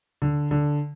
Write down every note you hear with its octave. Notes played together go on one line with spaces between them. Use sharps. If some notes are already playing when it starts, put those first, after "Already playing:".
D3
D3